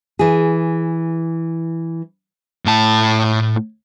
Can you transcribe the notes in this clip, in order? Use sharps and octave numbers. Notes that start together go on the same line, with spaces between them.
E3 G#4
A2 A5